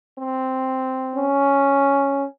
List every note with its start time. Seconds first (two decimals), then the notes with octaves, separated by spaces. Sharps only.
0.14 C4
1.15 C#4